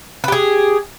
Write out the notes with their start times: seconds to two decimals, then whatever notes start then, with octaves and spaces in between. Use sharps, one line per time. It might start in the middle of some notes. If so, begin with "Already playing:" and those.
0.24 B4
0.28 G4
0.32 G#4